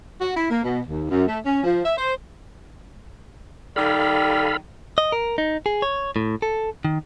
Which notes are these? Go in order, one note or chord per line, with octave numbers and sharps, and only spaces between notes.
F#4
E4
A#3
B2
D#2
F#2
A3
C#4
F3
E5
C5
D#3 G3 A4 F5 B5
D#5
A#4
D#4
G#4
C#5
A2
A4
D#3